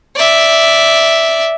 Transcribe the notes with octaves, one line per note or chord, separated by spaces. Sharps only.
D5 E5